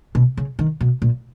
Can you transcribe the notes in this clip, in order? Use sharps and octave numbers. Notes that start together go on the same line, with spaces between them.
B2
C#3
D#3
B2
A#2